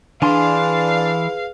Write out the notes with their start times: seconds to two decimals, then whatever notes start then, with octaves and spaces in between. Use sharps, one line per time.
0.22 E3 D4 G#4 B4 F5 G#5 C6